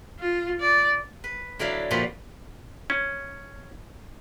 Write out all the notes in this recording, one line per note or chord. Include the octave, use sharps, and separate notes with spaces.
F4
D5
B4
D3 F#3 E4 D5 F5 B5
A#2 F3 G3 F#4 B4 C6
C#4